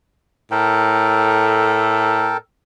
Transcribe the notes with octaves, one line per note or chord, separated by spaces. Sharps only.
A2 A4 A#4 G5